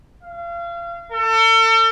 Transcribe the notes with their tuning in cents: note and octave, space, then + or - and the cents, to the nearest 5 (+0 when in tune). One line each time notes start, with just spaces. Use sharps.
F5 -30
A4 +35